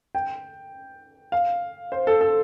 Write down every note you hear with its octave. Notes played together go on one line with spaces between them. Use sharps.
G5
F5
C5
A4
A4